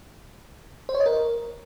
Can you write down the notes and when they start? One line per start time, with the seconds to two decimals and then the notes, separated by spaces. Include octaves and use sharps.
0.89 C5
0.95 C#5
1.00 D#5
1.06 A#4